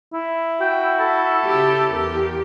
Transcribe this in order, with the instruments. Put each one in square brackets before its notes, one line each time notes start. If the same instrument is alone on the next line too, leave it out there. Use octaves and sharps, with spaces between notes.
[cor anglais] E4
[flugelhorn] F#4 [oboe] G5
[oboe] A4
[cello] C#3 G4
[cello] E2 G4 [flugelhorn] A#4